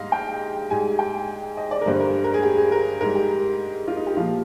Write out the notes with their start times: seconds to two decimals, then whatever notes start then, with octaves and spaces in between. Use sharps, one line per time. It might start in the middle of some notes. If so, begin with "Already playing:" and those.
Already playing: G#2 G3 D#5 F5
0.12 G5
0.70 G#2 G3 G#5
0.99 G5
1.57 D#5
1.71 D5
1.81 A#4
1.86 G2 D3 G3 C5
2.00 A#4
2.24 A#4
2.34 G#4
2.43 G4
2.57 G#4
2.72 A#4
3.01 G#2 G3 A#4
3.15 G4
3.88 F4
3.97 D#4
4.07 G4
4.17 A#2 F3 F4